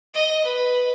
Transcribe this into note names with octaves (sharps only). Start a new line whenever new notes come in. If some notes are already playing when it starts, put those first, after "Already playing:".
D#5
B4